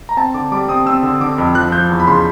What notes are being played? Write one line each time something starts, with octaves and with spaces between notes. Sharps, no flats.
A#5
C4 A5
D3 D6
G3 D6
C4 D#6
C4 E6
D3
D3 D6
F2
F3 F#6
F3 G6
E2
B5
C#3 C6